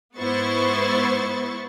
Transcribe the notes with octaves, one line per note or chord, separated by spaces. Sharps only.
G#2 B3 E4 C5 C#6 A6